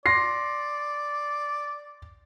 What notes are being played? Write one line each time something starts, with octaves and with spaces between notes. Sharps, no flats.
D5 C6 A#6 C7